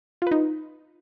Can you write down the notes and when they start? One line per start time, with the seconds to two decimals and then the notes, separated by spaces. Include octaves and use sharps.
0.22 F4
0.27 B4
0.31 D#4